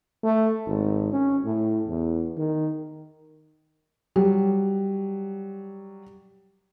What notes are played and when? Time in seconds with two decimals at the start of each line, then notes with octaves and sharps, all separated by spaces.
0.23 A3
0.66 G#1
1.12 C#4
1.44 A2
1.88 E2
2.37 D#3
4.16 F#3 G3